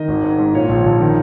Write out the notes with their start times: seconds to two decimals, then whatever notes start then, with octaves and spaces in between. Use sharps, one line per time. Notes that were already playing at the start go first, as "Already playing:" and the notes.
Already playing: D#3 D#5
0.08 G#1
0.23 G#2
0.38 G#2
0.54 A#2 C#5
0.69 A#1
0.85 A#1
1.00 D#3